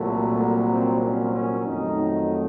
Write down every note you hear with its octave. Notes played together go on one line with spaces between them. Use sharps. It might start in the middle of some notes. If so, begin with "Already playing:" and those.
Already playing: C2 A#2 F#3 A3
A#3
C4
C#4
C#4
F2 D#3 F#3 A3 D#4